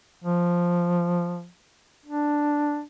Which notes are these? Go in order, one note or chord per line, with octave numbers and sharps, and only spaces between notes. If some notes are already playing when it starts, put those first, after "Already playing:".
F3
D4